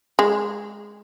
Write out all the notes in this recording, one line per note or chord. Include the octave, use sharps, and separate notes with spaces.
G#3